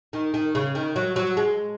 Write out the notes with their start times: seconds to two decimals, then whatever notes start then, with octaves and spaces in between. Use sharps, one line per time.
0.13 D#3
0.34 D#3
0.55 C#3
0.75 D#3
0.96 F#3
1.16 F#3
1.37 G#3